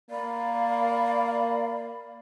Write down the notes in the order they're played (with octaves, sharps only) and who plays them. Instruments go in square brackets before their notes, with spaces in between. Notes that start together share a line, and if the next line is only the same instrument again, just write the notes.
[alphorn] A#3 [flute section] D5 B5 [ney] F5